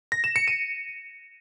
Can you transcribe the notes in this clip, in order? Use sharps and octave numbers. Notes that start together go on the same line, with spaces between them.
A#6
E7
C#7
D#7